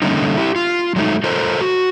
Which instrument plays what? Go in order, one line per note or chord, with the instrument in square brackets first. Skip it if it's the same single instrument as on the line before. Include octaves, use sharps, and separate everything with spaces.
[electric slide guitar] D3 G3 A3 A#3 C#4 D#4
E4 G4
F4
F#3 G#3 A3 D#4
F4 A4 A#4 C5
F#4